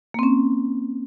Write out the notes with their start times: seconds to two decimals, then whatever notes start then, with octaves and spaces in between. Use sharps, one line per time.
0.14 A#3
0.19 C4
0.23 C#4